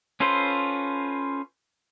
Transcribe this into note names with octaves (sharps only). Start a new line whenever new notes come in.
C#4 F4 A4 B4 C5